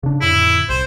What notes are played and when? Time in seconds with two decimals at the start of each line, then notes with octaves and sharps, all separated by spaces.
0.03 C#3 D4
0.21 F2 A2 D3 E4
0.69 C2 C5